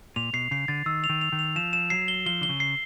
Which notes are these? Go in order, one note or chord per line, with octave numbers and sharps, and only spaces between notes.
A#2 F7
B2 C7
C#3 C7
D3 A6
D#3 E6
F7
D#3
F7
D#3
F7
F3 E7
E7
F#3 C7
G7
F3 G7
D3 G7
C#3
C7